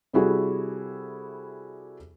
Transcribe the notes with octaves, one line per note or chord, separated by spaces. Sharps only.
C3 G3 E4 F#4 G#4 A4